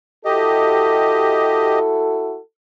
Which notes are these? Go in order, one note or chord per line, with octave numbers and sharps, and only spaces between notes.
E4 F#4 G4 A4 D#5